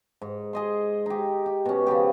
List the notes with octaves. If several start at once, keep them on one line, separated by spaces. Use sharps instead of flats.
G#2
G#4 D#5 C6
D#4 G4
G4
B2 C#4
C#3 F3 B3 G4